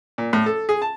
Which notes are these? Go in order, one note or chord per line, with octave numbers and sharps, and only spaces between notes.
A#2
A2
A4
G#4
A5